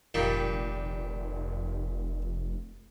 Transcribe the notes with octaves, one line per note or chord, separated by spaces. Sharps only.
F1 A#2 D#3 G3